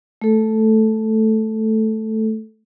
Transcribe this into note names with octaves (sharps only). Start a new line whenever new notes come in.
A3 A4